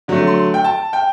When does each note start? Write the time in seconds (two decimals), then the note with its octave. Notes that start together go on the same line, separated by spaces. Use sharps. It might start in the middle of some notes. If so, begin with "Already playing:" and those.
0.08 D3 F#3 A3
0.27 C6
0.54 G5
0.64 A5
0.93 G5